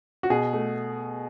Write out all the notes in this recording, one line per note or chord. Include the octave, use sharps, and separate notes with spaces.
F#4
B2 G#4
A3